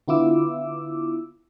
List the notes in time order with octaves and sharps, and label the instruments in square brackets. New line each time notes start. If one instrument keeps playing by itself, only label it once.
[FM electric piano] D3 B3 E4 F4 D6 E6